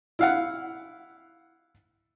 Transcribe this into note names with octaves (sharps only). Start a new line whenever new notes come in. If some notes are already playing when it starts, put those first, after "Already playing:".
E4 F5 F#5